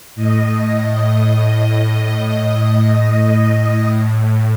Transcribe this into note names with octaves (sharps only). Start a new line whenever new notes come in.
A2 D#5
D#5
A2